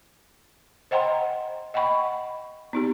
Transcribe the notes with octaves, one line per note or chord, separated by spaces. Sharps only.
C5 D#5 F#5 G5 A#5 C6
D#5 F#5 G5 B5 C#6
B3 D#4 G4